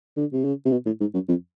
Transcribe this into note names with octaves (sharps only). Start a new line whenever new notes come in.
D3
C3
C#3
C3
B2
A2
G#2
F#2
F2